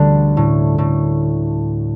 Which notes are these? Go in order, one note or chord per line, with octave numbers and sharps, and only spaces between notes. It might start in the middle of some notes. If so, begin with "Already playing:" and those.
Already playing: D2 D3 G3
A2
A2